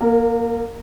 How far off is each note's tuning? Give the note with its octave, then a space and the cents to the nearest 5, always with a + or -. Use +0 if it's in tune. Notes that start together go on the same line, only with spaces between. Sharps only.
A#3 +15 A#4 -25